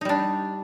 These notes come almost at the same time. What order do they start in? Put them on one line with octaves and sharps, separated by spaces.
D#4 G3 D4